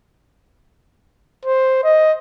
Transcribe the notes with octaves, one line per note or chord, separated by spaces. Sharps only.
C5
D#5